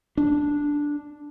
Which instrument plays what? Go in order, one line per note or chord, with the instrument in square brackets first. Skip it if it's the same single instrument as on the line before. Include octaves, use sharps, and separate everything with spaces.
[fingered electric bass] D4